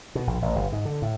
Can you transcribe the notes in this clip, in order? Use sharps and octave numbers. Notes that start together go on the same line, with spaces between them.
B2
A#1
A1
G1
G#2
D3
A2